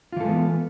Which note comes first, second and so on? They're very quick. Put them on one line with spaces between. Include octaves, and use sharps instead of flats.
F4 E3 A4 G#3 B3